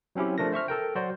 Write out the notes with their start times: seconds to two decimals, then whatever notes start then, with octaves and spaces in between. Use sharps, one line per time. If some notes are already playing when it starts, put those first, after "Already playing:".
0.15 F#3 C4 C#4 E4 G4
0.38 F3 A3 D4 A#4 A#6
0.52 C5 E5 C#6 F6
0.68 A4 A#4 G5
0.95 F#3 F#4 C5 D5